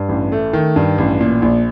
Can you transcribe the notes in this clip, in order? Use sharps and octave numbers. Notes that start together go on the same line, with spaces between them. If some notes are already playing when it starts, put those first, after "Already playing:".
Already playing: G2
A1
A3
D#3
G2
A1
A#2
A#1